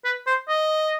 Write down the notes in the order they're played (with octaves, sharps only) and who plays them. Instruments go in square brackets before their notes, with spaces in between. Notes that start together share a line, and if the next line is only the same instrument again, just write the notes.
[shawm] B4
C5
D#5